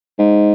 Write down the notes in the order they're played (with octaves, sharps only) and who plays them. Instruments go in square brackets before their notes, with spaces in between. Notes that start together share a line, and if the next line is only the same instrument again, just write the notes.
[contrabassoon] G#2